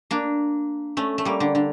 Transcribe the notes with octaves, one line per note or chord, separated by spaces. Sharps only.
A#3 D4
A3 C#4
A3
G3 A#3
D3
D3